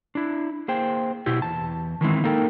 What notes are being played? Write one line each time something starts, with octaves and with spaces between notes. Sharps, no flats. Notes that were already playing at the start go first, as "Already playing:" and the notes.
D4 E4
A#3 G#4 C5 G5
B2 E4 G4
E2 A5
D#3 E3 G#3 C4
A#3 D#4 A4 A#4 G5